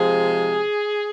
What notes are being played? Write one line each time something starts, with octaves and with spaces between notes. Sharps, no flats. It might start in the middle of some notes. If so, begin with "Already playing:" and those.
Already playing: C3 F3 G#3 G#4